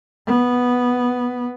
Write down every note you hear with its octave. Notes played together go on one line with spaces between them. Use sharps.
B3